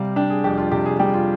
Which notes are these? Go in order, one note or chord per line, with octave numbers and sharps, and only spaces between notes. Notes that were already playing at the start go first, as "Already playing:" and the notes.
Already playing: C3 G3 F5
D4 G5
G#4
F2 G4
F4
C3 G4
G#4
G3 G4
F4